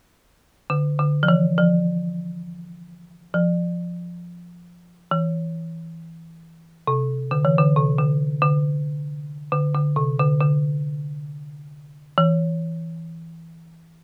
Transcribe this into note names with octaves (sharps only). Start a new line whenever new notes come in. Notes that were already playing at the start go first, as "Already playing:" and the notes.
D3
D3
F3
E3
F3
F3
E3
C3
D3
E3
D3
C3
D3
D3
D3
D3
C3
D3
D3
E3